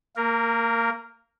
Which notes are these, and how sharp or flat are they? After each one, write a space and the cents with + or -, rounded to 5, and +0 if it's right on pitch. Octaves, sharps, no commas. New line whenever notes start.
A#3 -25 A#4 +0